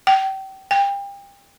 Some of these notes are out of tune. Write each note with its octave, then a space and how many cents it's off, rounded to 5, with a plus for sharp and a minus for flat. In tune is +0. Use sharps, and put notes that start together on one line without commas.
G5 -30
G5 +30